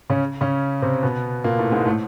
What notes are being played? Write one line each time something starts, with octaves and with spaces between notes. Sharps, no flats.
C#3 C#4
C#3 C#4
C3 C4
B2 B3
A#2 A#3
A2 A3
G#2 G#3
A2 A3